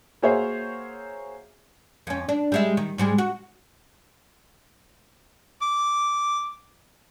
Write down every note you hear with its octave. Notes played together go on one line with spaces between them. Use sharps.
A#3 F#4 G#4 C5 C#5 E5
F2 C#4
D4
G3 G#3 E5
D#3
G#2 G3 G#3
F#4
D6